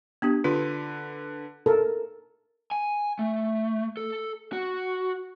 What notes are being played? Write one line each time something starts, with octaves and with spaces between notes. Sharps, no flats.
B3 D4 G4
D3 F4 B4
A4 A#4
G#5
A3
A4
F#4